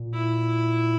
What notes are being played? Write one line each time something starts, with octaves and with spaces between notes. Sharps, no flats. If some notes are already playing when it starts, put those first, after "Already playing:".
Already playing: A#2
E4